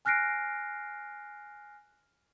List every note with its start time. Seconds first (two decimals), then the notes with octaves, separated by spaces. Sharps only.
0.05 G#5 F6 F#6 A#6 C7 D7